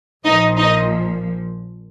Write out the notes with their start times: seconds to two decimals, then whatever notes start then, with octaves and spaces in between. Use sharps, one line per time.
0.24 A#1 A#2 F3 D#4 D#5
0.57 D#4 D#5